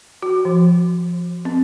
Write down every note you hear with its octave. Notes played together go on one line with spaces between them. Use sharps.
F#4
F3
C4